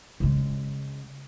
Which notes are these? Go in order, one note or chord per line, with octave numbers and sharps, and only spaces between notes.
C#3 G#3